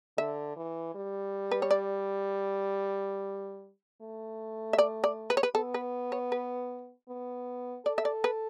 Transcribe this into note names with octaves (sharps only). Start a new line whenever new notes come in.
D3 E5
E3
G3
B4
C#5
D5
A3
E5
D5
D5
B4
C#5
B4
B3 A4
B4
C#5
B4
B3
A4 D5
E5
D5
B4